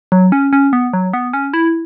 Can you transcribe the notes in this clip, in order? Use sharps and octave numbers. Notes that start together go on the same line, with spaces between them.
F#3
C#4
C#4
B3
F#3
B3
C#4
E4